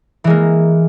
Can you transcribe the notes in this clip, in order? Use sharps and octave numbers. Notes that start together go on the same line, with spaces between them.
E3 G#3 A#3